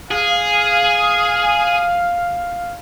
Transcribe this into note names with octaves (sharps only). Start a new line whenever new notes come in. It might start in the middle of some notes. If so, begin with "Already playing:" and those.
G#4 F5